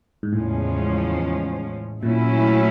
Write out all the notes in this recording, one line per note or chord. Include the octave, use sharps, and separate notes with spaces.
G#2
E2 A2 C#3 F3 G#3 C#4
A#2 F#3 A3 C#4 E4